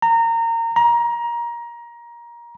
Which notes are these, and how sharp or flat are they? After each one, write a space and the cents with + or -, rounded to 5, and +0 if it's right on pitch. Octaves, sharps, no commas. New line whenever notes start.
A#5 -25
A#5 +20